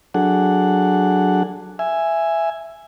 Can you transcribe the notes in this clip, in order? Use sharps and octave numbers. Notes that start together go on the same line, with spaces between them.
F#3 D4 G#4 A4 F#5
E5 G#5